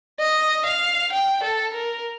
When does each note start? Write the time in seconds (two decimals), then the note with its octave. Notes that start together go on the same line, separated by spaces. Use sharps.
0.20 D#5
0.66 F5
1.12 G5
1.43 A4
1.74 A#4